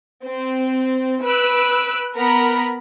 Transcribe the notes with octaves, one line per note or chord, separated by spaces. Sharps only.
C4
B4 E6 F#6 D7
B3 A#4 A#5 B5